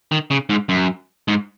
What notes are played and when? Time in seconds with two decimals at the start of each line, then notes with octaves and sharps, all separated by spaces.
0.12 D#3
0.31 C#3
0.50 G#2
0.69 F#2
1.28 G#2